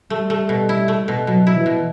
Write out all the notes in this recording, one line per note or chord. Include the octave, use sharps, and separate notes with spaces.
G3 A3
A3
B2
E4
A3
B2
B2 F#3
E4
E3
B2